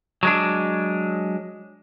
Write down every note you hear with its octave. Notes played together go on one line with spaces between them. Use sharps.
F#3 G#3 D4